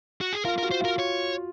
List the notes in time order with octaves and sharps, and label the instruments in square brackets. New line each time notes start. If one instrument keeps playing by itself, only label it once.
[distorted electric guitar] F#4
G#4
[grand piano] F4 [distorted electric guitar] A#4
[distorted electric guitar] A#4
[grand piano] F#4
[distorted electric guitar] C5
[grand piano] F4 [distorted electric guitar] A#4
[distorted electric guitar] C#5